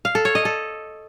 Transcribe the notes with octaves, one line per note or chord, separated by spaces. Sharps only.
F5
A4
C#5
D#5
A4